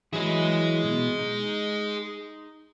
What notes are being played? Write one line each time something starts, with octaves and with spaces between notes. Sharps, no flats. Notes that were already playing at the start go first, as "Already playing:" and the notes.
E3 F#3 E4 G#4 D#5
B2
D#4